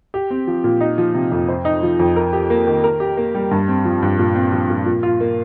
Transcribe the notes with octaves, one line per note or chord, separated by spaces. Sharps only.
G4
C4
F3
A#2
D#4
F3
C3
F2
C5
D#4
F3
F2
A#4
G4
A#3
D#3
A#4
G4
A#3
G3
G2
C4
F3
G2
A#2
C4
F3
A#2
A#2
F4
A#3